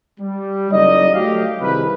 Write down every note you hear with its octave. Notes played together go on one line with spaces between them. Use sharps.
G3
F#1 F#3 D#4 D5 D#5
F#3 A3 G4 F5
C2 D#3 D#4 G#4 B4